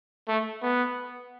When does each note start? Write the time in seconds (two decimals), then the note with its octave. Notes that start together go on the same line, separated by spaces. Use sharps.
0.28 A3
0.62 B3